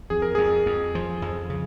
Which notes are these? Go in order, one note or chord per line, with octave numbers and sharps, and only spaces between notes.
F2 G#4
A#4
F2 G#4
F2
F3
F2
C#3